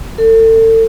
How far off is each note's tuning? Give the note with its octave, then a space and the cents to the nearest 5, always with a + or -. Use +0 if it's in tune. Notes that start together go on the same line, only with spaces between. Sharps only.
A4 +35